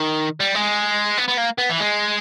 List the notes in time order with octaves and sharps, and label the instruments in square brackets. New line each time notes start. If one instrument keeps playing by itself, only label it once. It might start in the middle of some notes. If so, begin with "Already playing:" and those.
Already playing: [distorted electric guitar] D#3
G3
G#3
B3
B3
A#3
B3
E3
G#3